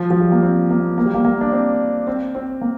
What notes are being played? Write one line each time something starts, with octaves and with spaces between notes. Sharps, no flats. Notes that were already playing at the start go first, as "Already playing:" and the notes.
Already playing: F3
F3
G3
A#3
C4
A#3
A#3
G3
A#3
A#3
D4
C4
C4
C4
A#3